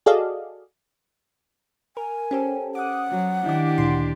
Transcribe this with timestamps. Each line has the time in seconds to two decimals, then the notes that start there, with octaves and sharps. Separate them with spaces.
0.06 F#4 G#4 A4 D5 D#5 F5
1.97 A#4 G#5
2.31 C#4 G4 A4 C5
2.75 F#5 D6 D#6
3.10 F#3
3.46 D#3 D4 E4 G4 D6
3.78 D2 A#2 C6